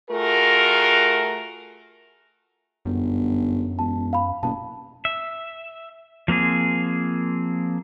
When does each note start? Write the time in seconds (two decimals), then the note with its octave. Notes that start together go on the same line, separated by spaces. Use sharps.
0.10 A3 F4 F#4 G#4 A#4
2.85 G1 F#2
3.79 E1 A5
4.13 F5 B5
4.43 F#1 B2 A5
5.05 E5
6.28 F3 A#3 C4 G#4